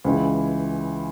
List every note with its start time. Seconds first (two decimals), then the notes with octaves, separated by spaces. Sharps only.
0.04 C#2 C#3 E3 G#3